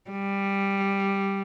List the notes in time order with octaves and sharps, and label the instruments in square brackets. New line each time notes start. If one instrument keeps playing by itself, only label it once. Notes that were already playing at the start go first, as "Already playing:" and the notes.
[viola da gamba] G3